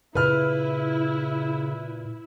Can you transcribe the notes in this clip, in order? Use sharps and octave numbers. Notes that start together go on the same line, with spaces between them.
A#2 C#3 E4 B4 F6